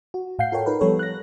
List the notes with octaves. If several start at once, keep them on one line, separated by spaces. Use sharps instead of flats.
F#4
A2 F5 F#5 G6 C7
F4 A4 A#4 C#5 G5
D#4 F4 A#4 B4
F3 G3 B3 A4 B4 C#5
F#6 A#6